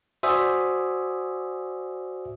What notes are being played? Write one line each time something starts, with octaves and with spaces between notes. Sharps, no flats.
F#4 C5 D5 E5 G#5 D#6